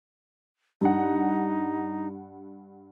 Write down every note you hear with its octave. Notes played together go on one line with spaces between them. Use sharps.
G2 D#4 F#5